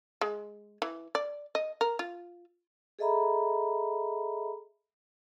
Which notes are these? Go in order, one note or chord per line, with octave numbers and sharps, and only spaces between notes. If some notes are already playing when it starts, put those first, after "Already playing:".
G#3
E3
D5
D#5
A#4
F4
G#4 A4 D#5 E5 A#5 B5